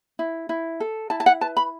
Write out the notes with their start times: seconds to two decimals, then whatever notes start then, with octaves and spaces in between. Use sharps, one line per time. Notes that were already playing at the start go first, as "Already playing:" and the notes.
0.19 E4
0.49 E4
0.80 A4
1.10 E4 A5
1.20 A5
1.26 F#5
1.41 B4 A5
1.57 B5